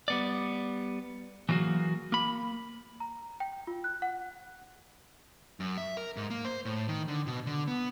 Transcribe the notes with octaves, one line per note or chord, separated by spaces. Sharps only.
G3 B3 D5
E3 F#3 G3 A#3 F#4 G#4
A#3 B5
A#5
G5
F4
F#6
F#5
F#2
E5
A#4
G#2
A#3
C5
A2
D#3
D3
B2
D3
B3